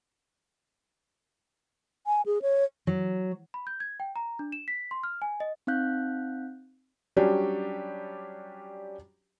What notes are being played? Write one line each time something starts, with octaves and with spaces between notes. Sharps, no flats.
G#5
G#4
C#5
F#3
B5
G6
G#6
G5
A#5
D4
E7
B6
C6
F6
G#5
D#5
C4 D#4 F5 F#6 G6
F#3 G3 C#4 D4 G4